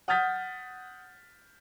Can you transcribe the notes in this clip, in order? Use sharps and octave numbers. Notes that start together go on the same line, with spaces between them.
F#5 D#6 F6 G6 A6 B6